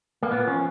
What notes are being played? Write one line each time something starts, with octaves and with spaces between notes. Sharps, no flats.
A#3
A#2 B3
F3 C#4